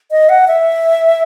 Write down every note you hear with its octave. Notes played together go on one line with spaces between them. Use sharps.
D#5
F#5
E5